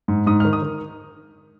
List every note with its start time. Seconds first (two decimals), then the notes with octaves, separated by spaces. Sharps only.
0.08 G#2
0.26 G#2 D#6
0.40 D#3 F6
0.53 D#6
0.62 D#3